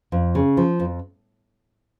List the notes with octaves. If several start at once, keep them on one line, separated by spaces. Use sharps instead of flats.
F2
C#3
F3
F2